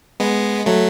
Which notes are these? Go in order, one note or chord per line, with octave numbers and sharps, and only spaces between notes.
G#3 B3
F#3 A3